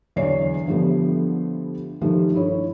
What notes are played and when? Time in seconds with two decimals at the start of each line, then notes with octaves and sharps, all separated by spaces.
0.16 E2 D3 F#3 C#5 D5 C7
0.67 D3 F3 G3 A3 B3
2.01 D#3 F3 G3 A3
2.34 G2 E4 C#5